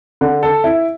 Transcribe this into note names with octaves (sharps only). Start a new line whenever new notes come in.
D3
A4
E4